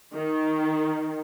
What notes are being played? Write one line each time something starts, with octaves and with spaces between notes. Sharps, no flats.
D#3